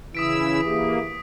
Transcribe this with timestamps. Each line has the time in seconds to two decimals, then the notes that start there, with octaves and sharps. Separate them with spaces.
0.15 C#3 E3 E4 D#6 E6 B6 D7
0.65 A#3 E4 G4 G#4